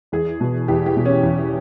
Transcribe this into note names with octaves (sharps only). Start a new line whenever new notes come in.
E2 G#4
B2
E2 G4
G4
B2
C#4
E2